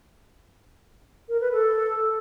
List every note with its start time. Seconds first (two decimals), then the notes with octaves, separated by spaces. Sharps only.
1.29 A#4
1.41 B4
1.52 A4